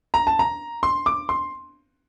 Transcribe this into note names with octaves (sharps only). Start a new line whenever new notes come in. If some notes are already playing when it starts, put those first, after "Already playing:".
A#5
A5
A#5
C6
D6
C6